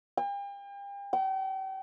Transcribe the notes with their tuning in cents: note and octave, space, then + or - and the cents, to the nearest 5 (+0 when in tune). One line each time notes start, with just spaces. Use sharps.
G5 +40
G5 -40